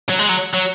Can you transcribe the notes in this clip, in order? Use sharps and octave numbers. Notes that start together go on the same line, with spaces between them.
F#3
G#3
F#3
F#3